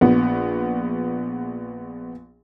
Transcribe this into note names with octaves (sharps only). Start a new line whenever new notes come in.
A#1 B3